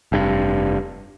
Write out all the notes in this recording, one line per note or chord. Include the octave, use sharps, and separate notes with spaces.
F1 G2